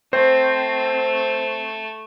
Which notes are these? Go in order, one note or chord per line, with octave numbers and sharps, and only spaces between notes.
A3 C4 C5